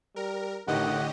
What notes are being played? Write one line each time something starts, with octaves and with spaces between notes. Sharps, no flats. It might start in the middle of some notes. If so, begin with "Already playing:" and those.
G3 A#4
A1 A2 D3 D#3 G4 D#5 F#5